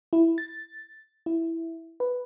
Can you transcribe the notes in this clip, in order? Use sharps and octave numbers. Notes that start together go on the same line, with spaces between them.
E4
A6
E4
B4